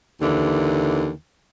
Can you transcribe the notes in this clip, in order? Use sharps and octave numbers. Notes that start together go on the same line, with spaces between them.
D#2 D3 E3